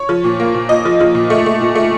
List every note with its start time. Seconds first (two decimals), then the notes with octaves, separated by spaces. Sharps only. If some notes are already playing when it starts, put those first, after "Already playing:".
Already playing: C#5
0.09 F3
0.24 A#2
0.40 A#3
0.54 A#2
0.69 A#2 D#5
0.85 F3
1.00 F3
1.15 A#2
1.30 A3
1.46 A3
1.61 A#2
1.75 A3